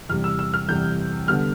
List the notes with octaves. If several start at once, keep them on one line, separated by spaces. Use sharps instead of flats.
E2 C3 G3 F6
E6
E6
F6
E2 C3 G3 G6
D3 G3 B3 F6